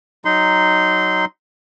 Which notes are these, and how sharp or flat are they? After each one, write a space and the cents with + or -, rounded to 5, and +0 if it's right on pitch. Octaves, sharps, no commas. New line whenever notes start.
F#3 +10 D#4 +0 C6 -20